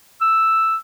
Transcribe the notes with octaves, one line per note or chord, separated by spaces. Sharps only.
E6